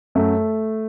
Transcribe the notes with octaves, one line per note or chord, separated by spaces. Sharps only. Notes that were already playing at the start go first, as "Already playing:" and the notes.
F#2 A3